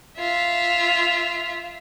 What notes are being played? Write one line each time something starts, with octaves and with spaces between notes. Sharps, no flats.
F4 E5